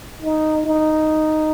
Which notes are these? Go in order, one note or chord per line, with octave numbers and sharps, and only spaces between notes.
D#4
D#4